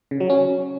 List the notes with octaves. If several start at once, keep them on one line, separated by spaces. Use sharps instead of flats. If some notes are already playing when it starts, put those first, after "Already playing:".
C#3
F#3
C#4